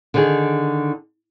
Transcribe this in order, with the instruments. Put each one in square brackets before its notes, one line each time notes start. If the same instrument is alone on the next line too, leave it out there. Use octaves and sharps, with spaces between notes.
[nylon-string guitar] D3 D#3 G#4